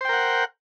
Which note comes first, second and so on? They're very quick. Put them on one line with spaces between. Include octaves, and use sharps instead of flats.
C5 G5 A#4 F#5